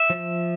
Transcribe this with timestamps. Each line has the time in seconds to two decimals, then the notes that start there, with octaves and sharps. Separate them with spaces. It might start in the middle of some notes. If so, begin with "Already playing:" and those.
Already playing: E5
0.10 F3